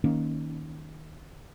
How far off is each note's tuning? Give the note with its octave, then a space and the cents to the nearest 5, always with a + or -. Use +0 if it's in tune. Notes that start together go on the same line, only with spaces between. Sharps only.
D#3 +0 A#3 +0 C#4 +0